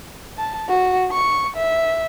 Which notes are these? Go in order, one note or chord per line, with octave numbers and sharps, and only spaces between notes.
A5
F#4
C#6
E5